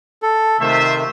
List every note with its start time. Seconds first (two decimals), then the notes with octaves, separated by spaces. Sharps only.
0.22 A4
0.60 C3 D#3 A3 F4 C5 E5